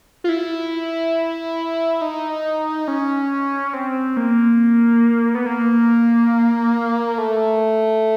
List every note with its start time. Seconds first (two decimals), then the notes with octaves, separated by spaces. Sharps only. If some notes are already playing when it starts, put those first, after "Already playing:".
0.24 F4
0.29 E4
2.01 D#4
2.88 C#4
3.74 C4
4.17 A#3
5.35 B3
5.46 A#3
7.18 A3